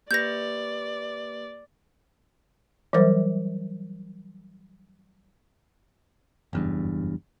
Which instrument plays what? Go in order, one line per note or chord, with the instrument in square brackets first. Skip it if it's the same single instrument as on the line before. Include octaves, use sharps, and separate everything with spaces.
[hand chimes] A#3 G4 B4 [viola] D5 [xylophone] G6 A#6
[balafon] E3 F#3 G3 A#4 C5
[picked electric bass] F#1 E2 G2